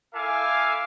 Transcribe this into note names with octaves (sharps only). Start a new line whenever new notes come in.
E4 A4 E5 F5 G#5 D6